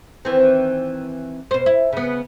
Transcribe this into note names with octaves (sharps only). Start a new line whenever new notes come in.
D#3 E3 C4
B2 C5
E4
C#3 B3